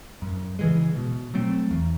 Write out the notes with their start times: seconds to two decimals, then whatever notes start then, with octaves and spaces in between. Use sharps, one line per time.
0.22 F#2
0.59 C#3 E3 G#3
0.96 B2
1.34 F#3 A3 C4
1.71 E2